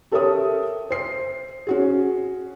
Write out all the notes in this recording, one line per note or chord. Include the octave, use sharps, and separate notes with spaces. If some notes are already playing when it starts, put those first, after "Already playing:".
G4 A4 A#4 C#5 E5 D#6
C5 C7
C#4 F#4 G#4